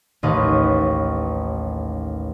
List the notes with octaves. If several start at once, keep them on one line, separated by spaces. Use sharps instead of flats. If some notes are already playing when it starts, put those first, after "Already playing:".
A1 D#2 B4 D#5 F5 C#6